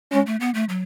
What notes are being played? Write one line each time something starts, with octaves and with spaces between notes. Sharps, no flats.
G#3 C#4
A3
B3
A3
F#3